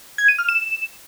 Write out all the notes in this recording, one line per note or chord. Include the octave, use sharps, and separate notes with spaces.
G#6
D#7
F6
E7